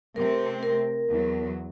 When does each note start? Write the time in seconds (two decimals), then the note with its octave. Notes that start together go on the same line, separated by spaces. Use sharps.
0.16 C3 A3 C4 A#4
0.63 A#4
1.08 E2 F#3